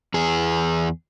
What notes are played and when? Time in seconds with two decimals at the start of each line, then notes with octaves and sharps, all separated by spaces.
0.14 E2 G#4